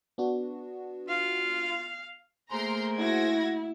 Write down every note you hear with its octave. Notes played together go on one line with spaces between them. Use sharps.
B3 D4 F#4
F4 F5
A3 A#3 G#4 A#4 C5 A#5 C6
E4 F#4 G#6 A#6